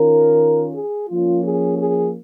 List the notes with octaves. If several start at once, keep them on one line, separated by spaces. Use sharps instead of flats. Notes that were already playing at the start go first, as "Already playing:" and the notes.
Already playing: D#3 C#4 F4 A#4
G#4
F3 A#3 C#4 F4
G#4
G#4